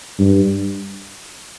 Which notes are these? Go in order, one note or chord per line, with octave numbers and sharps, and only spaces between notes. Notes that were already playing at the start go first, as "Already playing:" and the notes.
G2